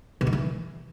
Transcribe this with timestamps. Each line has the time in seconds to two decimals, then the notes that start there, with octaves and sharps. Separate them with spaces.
0.21 B2
0.27 D#3
0.33 E3